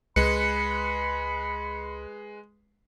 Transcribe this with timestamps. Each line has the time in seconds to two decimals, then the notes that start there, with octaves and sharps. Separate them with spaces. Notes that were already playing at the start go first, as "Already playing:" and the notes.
0.16 C#2 G#3 B4 B5 C#7